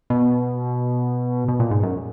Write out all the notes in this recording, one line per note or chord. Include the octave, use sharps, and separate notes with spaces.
B2
B2
A#2
G#2
F#2